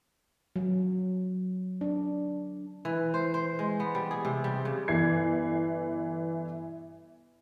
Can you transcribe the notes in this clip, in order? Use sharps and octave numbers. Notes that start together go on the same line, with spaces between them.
F#3
D4
E3
C5
C5
G#3
B3
G3
G#4
C3
G3
C#3
G1 E3 G#6 C7